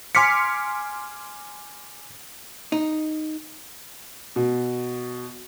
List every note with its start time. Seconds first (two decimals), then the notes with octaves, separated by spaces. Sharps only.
0.15 G#5 C6 D6 F6 B6 C#7
2.72 D#4
4.36 B2